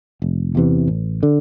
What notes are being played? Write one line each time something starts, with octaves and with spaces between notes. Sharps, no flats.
F1
E2 C3 E3
A1
D3